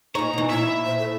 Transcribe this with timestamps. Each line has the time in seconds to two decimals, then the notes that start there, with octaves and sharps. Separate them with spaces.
0.15 A#2 D#4 C#5 A#5
0.33 B2 E3
0.50 A#2 E4 E5
0.85 C5
0.99 A4